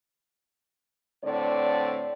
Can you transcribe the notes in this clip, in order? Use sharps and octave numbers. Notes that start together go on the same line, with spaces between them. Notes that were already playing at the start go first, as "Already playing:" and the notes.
A2 D3 C4 D5